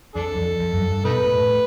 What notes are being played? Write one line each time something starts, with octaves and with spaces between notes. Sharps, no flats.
F2 D4 A4
F2
F2
F#2
G2
B2 D#4 B4
A2
A2